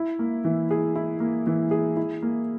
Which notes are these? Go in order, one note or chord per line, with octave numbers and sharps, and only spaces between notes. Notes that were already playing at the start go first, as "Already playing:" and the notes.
Already playing: E4
A#3
E3
G#4
E4
A#3
E3
G#4
E4
A#3